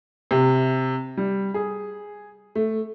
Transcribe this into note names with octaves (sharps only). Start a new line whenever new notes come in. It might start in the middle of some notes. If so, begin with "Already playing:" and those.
C3
G3
G#4
A3